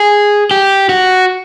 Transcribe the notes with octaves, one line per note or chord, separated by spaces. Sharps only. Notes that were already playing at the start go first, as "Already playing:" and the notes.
Already playing: G#4
G4
F#4